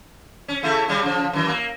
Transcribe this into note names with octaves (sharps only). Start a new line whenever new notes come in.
C#4
C#3 A3 E4
C#3 G3
C#3 F3
F#2 E3
A#3